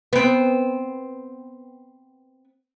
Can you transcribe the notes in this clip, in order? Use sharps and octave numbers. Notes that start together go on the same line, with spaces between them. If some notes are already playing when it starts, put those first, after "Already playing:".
B3 C4